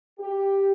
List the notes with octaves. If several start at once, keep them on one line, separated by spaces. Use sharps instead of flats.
G4